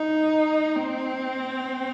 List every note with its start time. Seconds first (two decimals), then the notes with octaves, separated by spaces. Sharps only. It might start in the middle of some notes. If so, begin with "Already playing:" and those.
Already playing: D#4
0.76 C4